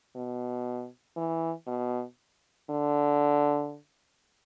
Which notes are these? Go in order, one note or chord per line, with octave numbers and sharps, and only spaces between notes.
B2
E3
B2
D3